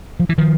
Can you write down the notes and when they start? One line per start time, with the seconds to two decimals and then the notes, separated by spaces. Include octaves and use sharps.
0.20 F3
0.29 E3
0.38 D#3 F3